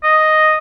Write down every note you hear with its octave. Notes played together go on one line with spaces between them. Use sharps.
D#5